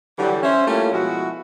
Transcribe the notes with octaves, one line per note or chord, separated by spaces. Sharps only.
D3 E3 F#3 G3
C#4 C5 E5
G3 A3 A#3 C#4 E4 F4
B2 F3 G#3 E4 F#4